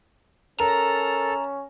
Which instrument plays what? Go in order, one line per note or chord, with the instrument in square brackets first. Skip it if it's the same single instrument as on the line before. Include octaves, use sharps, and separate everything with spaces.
[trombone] C#4 [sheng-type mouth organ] A4 A5 [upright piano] A#4 [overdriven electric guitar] A#5